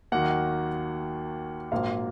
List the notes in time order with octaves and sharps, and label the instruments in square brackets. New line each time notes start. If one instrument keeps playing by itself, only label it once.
[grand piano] D#2 D#3 F#3 A#3 F#5
A#1 G#2 F#3 A#3 F5